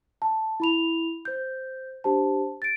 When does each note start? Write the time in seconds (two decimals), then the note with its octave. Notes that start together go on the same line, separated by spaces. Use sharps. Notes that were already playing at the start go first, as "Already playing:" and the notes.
0.22 A5
0.60 E4 B5 F7
1.25 C5 G6
2.04 D4 G4 C5 A5
2.62 A6 D7